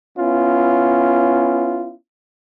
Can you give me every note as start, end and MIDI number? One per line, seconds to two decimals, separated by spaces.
0.18 1.94 59
0.18 1.94 61
0.18 1.94 64
0.18 1.94 65